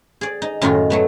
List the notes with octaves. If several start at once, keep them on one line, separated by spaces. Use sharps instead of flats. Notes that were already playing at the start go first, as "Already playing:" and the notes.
G#4 D5
D#4
F#2 A2 D#3 D#4 F4
F#3 A3 B3